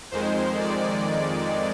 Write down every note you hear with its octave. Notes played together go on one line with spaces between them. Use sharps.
F2 D#3 G#3 C5
D5